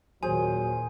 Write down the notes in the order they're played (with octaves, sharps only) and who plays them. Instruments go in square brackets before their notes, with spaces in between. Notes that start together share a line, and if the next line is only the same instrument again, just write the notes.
[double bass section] D#2 A#2 [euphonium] F#3 [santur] G#4 C5 [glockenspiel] G#5